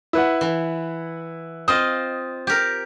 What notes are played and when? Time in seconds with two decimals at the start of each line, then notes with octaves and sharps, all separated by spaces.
0.13 E4 B4 F#5
0.41 E3
1.68 C4 F4 D#5 D#6
2.47 G4 A#4